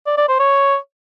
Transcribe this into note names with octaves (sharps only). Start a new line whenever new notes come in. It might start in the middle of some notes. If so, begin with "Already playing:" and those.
D5
D5
C5
C#5